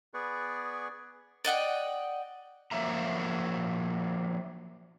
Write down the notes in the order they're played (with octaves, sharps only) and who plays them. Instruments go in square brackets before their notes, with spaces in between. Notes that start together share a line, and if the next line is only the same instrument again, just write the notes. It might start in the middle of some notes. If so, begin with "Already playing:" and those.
[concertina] B3 G#4 B4 D5 C#6
[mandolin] D5 D#5 F#5 G5
[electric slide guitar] F3 F#3 A#3 E5 A#5